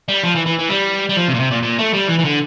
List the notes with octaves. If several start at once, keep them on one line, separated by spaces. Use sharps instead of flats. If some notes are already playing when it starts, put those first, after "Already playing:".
G3
F3
E3
E3
E3
G3
G3
F3
C3
A#2
C3
A#2
A#2
A3
G3
E3
E3
D3